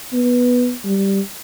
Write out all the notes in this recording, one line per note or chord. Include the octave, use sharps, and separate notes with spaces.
B3
G3